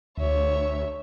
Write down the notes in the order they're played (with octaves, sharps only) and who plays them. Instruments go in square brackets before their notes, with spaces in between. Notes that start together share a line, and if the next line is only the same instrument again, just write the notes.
[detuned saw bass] D2 [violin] C#5 E5